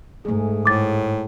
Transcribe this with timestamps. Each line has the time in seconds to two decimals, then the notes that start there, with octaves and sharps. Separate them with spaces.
0.25 G#2 A3 G#4
0.66 A2 D6 A6